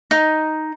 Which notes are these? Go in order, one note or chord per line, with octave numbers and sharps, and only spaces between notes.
D#4